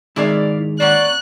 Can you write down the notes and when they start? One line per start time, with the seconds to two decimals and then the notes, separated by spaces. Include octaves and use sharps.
0.16 G#2 D#3 G#3 E4 D5 F5
0.80 A#3 C#4 D5 F#5 F#6